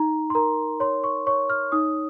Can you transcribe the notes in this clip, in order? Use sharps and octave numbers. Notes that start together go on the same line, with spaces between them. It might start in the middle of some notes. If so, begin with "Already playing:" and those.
Already playing: D#4 A#5
C6
A#4 A#5
C#5 C6
C#6
C#5 C#6
F6
D#4 D#6